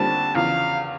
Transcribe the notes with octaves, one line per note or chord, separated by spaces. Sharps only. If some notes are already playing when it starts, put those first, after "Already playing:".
Already playing: D#2 D3 G3 C4 F4 A5
E2 C#3 F3 F5